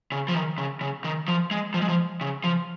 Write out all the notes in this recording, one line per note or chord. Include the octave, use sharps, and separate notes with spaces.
C#3
F3
D#3
C#3
C#3
D#3
F3
G#3
F3
G#3
F3
C#3
F3